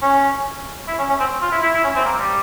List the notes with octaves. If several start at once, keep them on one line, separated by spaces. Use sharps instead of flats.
C#4
E4
C#4
C#4
C4
F4
E4
E4
E4
C#4
C4
A#3
G3